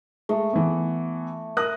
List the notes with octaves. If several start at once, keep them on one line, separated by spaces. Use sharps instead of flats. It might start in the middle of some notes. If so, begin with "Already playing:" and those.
G#3 A3
E3 B3
A#4 D#5 D#6 F#6